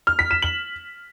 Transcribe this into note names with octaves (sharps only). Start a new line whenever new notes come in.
F6
B6
E7
F#7